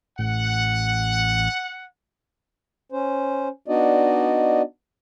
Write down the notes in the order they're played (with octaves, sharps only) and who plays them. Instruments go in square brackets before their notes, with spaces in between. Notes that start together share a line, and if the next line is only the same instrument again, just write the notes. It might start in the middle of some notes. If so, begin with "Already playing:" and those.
[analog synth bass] A1 [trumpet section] F#5
[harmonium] C#4 C5
B3 D4 D#4 F#4 D5 D#5